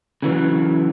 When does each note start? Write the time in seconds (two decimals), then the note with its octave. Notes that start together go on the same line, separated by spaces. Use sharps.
0.22 C#3 E3 F#3